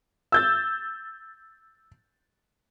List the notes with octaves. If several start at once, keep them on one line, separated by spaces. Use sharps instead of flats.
E6 G6 A6